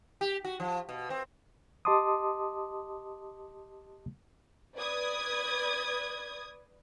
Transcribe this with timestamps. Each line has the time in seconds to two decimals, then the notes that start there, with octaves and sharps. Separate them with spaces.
0.21 G4
0.45 F#4
0.60 F3
0.89 B2
1.10 C4
1.85 G4 D#5 A5 C6 D6 D#6
4.77 B4 D5 D#6 G#6